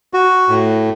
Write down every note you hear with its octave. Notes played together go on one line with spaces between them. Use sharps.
F#4
A2